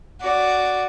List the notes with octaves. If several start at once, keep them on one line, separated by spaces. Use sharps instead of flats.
F#4 D5